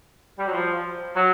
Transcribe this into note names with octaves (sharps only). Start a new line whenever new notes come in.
G3
F#3
F3
F#3